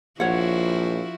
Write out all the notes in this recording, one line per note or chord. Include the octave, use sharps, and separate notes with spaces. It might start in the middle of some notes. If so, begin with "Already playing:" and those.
A#1 F3 E4 F#4 C#5 F#5